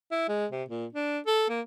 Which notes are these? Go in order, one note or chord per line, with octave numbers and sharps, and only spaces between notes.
E4
G#3
C3
A#2
D4
A4
A#3